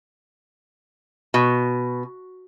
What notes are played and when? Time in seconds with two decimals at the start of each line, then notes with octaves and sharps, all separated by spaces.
1.34 B2